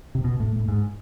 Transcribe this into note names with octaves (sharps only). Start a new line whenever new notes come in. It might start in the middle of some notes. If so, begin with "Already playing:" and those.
C3
B2
A2
A2
G#2